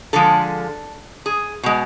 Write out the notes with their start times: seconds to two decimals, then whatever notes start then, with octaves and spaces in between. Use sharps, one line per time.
0.13 D3 F3 G#3 A4
1.26 G#4
1.63 B2 G#3